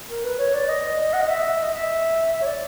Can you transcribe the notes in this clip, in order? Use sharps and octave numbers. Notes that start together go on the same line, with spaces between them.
A#4
B4
C#5
D5
D#5
F#5
D#5
E5
D#5
E5
E5
C#5
D5